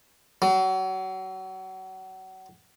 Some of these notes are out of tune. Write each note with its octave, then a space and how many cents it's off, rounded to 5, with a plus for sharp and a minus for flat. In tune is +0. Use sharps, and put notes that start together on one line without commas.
F#3 +30